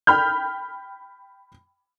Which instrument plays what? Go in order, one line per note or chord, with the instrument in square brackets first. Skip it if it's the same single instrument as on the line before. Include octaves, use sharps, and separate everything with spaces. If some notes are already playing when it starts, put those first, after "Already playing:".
[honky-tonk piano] G5 B5 F6 G6